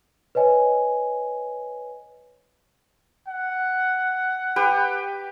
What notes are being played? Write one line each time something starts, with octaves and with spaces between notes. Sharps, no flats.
B4 C#5 D#5 G#5
F#5
G4 B4